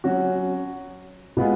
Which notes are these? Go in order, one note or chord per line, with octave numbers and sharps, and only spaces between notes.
F#3 C#4 F#4
B2 G#3 B3 F4 G#4